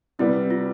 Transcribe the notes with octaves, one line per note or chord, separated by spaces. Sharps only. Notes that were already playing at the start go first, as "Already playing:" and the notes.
C3 G3 B3 E4
F4